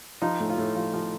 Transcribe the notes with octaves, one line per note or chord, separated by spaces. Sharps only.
F3 D#4
A2
F4
A2
F3
F3